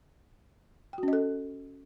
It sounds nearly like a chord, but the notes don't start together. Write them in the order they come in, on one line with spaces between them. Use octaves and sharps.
G5 F#4 C#4 D#5 A4